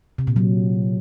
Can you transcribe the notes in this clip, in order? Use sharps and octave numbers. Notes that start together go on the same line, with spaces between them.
C3
A#2
F#3